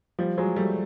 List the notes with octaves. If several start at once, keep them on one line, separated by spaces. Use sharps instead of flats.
F3 G3
F#3 G#3
G3 A3